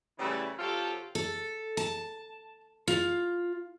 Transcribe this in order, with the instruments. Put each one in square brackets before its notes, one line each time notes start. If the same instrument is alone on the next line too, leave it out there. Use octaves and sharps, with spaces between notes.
[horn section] C#3 E3 G3 A3 E4
C3 F#3 F4 G4 A4
[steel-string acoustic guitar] A4
A5
F4